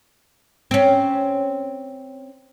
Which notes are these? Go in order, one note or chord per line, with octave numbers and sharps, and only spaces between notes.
C4 C#4